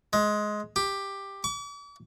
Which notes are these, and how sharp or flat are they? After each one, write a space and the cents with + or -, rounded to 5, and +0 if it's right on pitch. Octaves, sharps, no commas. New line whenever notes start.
G#3 +15
G4 +10
D6 -45